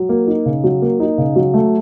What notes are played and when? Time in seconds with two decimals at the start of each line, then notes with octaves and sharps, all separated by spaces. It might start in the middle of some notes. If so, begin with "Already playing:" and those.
Already playing: F#3
0.09 A#3
0.27 D#4
0.46 C#3
0.64 F#3
0.82 A#3
1.00 D#4
1.18 C#3
1.36 F#3
1.54 A3